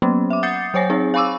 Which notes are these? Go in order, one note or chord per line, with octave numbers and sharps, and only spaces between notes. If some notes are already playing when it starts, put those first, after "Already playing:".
F#3 A#3 B3 C#4
E5 D6
F#5 D#6 G6 A6 C7 C#7
F#3 C5 C#5 G#5 A#6
C4 D#4 G#4
F5 G#5 B5 C#6 D6 E6